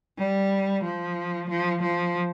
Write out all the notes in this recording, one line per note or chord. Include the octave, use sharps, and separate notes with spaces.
G3
F3
F3
F3